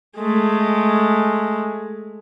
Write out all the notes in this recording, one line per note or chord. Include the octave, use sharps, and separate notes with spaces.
G#3 A3